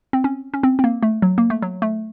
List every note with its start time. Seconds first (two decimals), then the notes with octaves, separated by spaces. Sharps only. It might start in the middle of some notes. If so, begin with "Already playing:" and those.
0.13 C4
0.24 C#4
0.54 C#4
0.63 C4
0.79 C4
0.84 A#3
1.03 A3
1.22 F#3
1.38 A#3
1.50 A3
1.62 F#3
1.82 A3